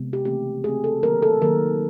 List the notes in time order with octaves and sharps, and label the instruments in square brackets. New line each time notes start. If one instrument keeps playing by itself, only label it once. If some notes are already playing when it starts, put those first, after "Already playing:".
Already playing: [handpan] C3 G#3 B3
G4
C#3 E3 A3 C4 G4
C#3 E3 A3 C4 G#4
A4
D#3 F#3 A#3 A#4
A4
D#3 F#3 A#3 A#4